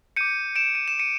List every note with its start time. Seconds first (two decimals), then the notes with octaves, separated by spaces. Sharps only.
0.17 D6 G6 C#7 D#7
0.56 D7 E7
0.75 D#7
0.88 E7
0.99 C#7 D#7